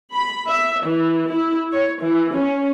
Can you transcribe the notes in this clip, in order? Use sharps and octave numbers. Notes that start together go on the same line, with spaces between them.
B5
E5
E3
E4
C#5
E3
C#4